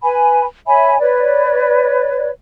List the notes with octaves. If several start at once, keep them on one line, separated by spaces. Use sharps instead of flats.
B4 G#5 B5
C#5 E5 G#5 B5
B4 C#5 D5